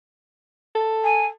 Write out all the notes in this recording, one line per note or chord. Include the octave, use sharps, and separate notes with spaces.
A4
G#5